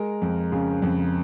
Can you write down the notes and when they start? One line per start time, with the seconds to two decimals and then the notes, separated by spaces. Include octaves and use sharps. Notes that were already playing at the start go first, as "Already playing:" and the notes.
Already playing: G#3 A#4
0.22 F2
0.52 C#3
0.82 F2